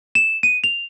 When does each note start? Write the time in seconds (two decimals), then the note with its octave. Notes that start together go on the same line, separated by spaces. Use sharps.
0.15 E7
0.43 D#7
0.64 F7